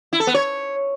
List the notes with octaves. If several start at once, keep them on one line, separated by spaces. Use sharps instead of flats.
E4
A4
B3
C#5